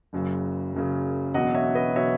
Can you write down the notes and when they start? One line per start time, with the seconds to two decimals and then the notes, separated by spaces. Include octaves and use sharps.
0.13 F#1 F#2 C#3
0.74 F#1 F#2 C#3
1.34 E1 E2 B2 F#3 D#5 F#5
1.55 C#5 E5
1.75 B4 D#5
1.96 B2 F#3 C#5 E5